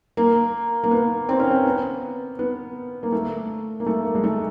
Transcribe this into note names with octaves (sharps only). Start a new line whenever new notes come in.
A#3
A#3
B3
C4
C#4
C4
B3
B3
A#3
A3
A#3
A3
A#3
G#3
A3